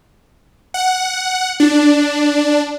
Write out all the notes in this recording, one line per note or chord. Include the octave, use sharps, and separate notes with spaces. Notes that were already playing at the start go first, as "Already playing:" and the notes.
F#5
D4